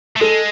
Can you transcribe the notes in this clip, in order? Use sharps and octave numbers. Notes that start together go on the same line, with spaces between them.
A3
G#3 A4